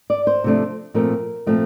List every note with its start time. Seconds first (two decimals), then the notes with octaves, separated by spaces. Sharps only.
0.10 D5
0.27 C5
0.44 C3 F3 A3 D4
0.94 A#2 F3 A3 C4 A#4
1.46 A#2 F3 A3 C4